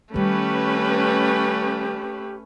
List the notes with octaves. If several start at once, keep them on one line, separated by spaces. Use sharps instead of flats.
D#3 G3 A3 C#4 G4 B4